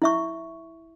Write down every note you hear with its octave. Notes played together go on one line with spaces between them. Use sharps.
E4 E5 C#6